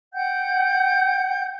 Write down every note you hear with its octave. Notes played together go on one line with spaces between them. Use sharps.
F#5 G5 G6